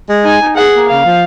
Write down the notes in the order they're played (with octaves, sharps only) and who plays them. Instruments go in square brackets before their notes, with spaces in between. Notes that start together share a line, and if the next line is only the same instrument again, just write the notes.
[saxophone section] G#3
[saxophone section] D#4 [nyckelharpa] G#5
[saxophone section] D#4
[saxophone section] G#4 [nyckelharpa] F#5
[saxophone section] A#3
[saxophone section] C#3 [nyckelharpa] F5
[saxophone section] F3